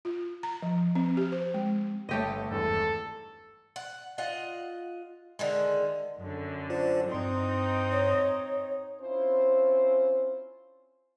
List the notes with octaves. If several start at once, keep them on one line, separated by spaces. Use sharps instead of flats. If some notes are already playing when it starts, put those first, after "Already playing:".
F4
A#5
F3
C4
G4
C5
G#3
G1 A3 G4 A4 C#5 D#5
G#1 E2 G2 A4
F#5
F4 D#5 F#5
D3 D#3 G#3
F#2 D3
F4 C5 D5
G2 C4 D#4 C6
C#5
C4 C#4 E4 F4 C5